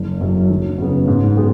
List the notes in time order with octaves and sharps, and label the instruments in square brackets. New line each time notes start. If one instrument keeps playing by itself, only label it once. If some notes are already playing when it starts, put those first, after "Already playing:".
Already playing: [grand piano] F#1
F#2 F#3
F#1
F#2 C#3 B3
G#2
F#3 B3 G#4